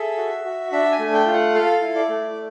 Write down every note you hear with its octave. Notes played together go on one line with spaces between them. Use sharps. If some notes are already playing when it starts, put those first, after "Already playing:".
Already playing: G#4 A4 E5
F#4
F#4
D4 E5
G#5
A3
G5
F4
F#5
A4 F5
E4
D5
A3